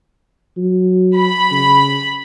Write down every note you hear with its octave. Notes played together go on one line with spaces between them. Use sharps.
F#3
B5
C#3